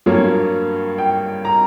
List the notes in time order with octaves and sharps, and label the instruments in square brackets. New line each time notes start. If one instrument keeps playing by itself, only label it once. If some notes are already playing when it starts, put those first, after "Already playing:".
[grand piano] G2 F#3 A#3 C#5
G5
A#5